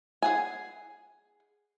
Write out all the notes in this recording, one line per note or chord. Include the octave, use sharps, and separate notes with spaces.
G#4 F#5 G#5